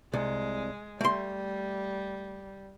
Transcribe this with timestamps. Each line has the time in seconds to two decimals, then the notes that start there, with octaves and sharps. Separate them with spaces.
0.14 C2 G#3
1.01 G3 A3 C6